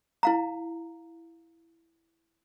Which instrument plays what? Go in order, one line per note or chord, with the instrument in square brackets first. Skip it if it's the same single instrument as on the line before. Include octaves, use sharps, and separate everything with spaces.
[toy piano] E4 F5 A#5